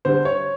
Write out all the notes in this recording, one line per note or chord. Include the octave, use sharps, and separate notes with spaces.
D3 G3 C5
C#5